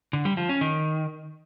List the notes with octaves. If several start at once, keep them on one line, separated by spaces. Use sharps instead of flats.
D3
G3
F3
C#4
D#3